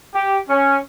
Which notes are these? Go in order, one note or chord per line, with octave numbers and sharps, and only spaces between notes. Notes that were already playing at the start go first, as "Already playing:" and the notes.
G4
C#4